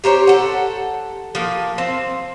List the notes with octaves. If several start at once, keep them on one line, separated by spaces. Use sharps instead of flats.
G4 A#4 C5 C#5
A4 F#5
F3 A#3
C4